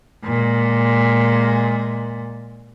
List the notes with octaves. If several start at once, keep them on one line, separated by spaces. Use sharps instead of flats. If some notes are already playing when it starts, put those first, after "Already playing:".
A#2 G#3